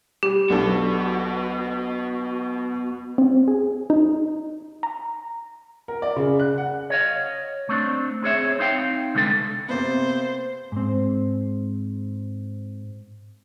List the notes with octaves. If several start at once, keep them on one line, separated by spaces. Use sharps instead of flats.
G3 G4
B1 B3 D4 F#4 A4
C4
G#4
D#4
A#5
A#4
D5
C#3
F#6
F#5
C#5 D#5 F5
A3 C4 D4
C4 G#4 C#5 E5
C4 D#4 F5 G5
C2 D3 G#3 B3 A4
C3 A#3 B3 C5
G#2 C4